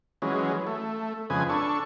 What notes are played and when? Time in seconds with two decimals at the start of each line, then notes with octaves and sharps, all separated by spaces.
0.22 E3 F#3 G#3 C#4
0.67 A3
1.30 F2 C#3 G#3 B4 G#5
1.49 D4 A4 C#6